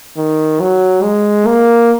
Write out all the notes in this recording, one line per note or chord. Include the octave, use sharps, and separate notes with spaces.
D#3
F#3
G#3
A#3